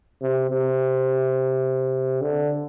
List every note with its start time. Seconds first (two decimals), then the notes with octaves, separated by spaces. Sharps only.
0.22 C3
0.49 C3
2.21 D3